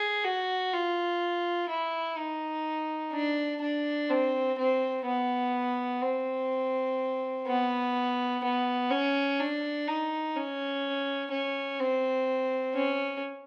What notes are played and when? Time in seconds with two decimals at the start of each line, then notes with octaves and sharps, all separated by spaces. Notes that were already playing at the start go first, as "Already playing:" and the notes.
Already playing: G#4
0.24 F#4
0.73 F4
1.69 E4
2.17 D#4
3.13 D4
3.61 D4
4.10 C4
4.58 C4
5.05 B3
6.01 C4
7.46 B3
8.43 B3
8.90 C#4
9.39 D4
9.87 D#4
10.35 C#4
11.31 C#4
11.79 C4
12.75 C#4